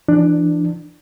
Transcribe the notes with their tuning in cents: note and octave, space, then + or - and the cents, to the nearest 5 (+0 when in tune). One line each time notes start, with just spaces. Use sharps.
E3 +35 D4 +15